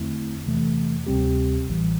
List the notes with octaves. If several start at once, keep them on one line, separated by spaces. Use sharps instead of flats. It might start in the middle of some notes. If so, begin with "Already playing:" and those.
Already playing: E2 D3 A3 C4 E4
E2 C3 E3 A3
D2 C3 G3 C4 G4
A1 A2 E3 G3